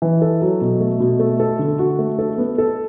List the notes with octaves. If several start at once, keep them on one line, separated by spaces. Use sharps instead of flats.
E3
A4
F#3
B2
A3
B2
A3
A4
D3
F#4
A3
A4
B3
A4